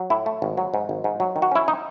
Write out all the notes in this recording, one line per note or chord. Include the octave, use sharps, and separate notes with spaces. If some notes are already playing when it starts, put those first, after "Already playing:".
Already playing: F#3
A2 E4
A3
G#1
F#3
G#2
G#1
G#2
F#3
D#3
F#4
C#4 E4
D#4